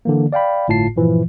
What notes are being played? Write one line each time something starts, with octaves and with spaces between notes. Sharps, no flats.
D3 E3 A#3
D5 F5 G5 B5
G1 A2 F4 A5 C7
G2 A#2 E3 F3